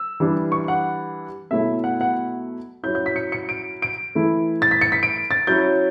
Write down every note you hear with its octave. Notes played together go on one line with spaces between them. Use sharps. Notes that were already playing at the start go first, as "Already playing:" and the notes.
Already playing: E6
E3 G3 D4
C#6
F#5
B2 F#3 A3 E4 E5
F#5
F#5
F#3 C#4 E4 G6
G6
B6
C#7
C#7
D7
D7
E3 A3 E4
A6
B6
C#7
B6
D7
A6
F#3 C#4 E4 G6